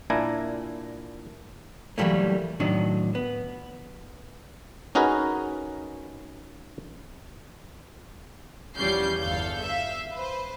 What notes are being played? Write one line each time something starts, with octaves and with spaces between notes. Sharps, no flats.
A#2 D4 E4 G#5 A#5
E3 F#3 G3 A3 A#3
A2 D#3 F#3 D4
B3
C#4 D#4 F#4 G#4 A#4 B4
E2 F3 G3 C#4 G6 C7
G1 E2 A4 F5 G6
E5 F5
B4 C5